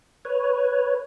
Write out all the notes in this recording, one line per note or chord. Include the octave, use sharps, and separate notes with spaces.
B4 C#5